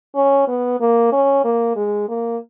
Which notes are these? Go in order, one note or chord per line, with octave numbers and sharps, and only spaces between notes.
C#4
B3
A#3
C#4
A#3
G#3
A#3